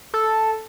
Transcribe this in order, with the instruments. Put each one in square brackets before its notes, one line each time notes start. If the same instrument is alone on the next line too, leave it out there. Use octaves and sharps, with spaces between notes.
[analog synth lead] A4